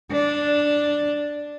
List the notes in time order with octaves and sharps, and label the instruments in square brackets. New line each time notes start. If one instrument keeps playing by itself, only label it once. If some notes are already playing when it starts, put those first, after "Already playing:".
[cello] D4